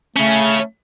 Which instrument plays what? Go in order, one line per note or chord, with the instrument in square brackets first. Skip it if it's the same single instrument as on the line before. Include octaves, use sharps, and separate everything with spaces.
[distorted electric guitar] C#3 C#4 [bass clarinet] A3